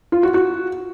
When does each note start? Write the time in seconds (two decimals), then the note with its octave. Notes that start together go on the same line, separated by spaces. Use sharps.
0.12 F4
0.23 F#4
0.34 F#4